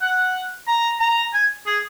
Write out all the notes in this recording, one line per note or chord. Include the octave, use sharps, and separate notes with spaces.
F#5
A#5
A#5
G#5
G#4